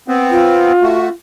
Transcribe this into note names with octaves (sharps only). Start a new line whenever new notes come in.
B3 C4
F4
A3 F#4